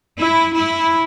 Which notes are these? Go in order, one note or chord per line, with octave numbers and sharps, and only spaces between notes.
E4
E4